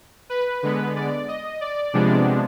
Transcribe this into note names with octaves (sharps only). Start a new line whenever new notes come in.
B4
D3 G#3 B3
D5
D#5
D5
C3 F3 G#3 B3 D4